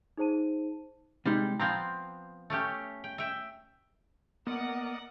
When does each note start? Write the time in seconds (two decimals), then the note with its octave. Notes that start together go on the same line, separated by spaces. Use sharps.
0.17 D#4 G#4 C5 A5 D#7
1.25 C3 G3 G#3 D#4
1.60 F3 B3 C4 A#5
2.50 A3 C#4 G4
3.04 G5
3.18 E5 G5
4.47 A#3 B3 A#4 D5 D#5 F#5